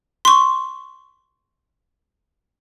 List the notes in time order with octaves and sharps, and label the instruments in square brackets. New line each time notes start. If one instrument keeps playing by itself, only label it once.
[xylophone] C6 C#6